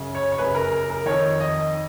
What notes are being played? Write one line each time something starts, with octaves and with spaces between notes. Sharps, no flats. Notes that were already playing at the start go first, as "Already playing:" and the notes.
Already playing: F#2 C#3
C#5
C#5
F#2 C#3 B4
A#4
A#4
A#4
F2 D#3 C#5
D#5